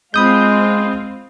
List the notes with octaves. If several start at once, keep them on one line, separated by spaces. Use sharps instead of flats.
G#3 C4 F4 B5 D#6 G6